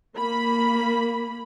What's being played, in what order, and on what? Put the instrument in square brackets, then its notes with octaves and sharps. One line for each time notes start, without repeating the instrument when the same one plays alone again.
[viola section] A#3 B5